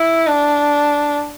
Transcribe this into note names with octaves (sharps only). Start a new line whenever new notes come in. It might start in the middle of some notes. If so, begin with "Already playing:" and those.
Already playing: E4
D4